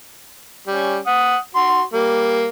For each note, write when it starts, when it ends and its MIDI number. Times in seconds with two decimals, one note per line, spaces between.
0.67 0.98 55
0.67 0.98 61
1.07 1.37 78
1.07 1.37 87
1.55 1.82 66
1.55 1.82 84
1.93 2.47 55
1.93 2.47 58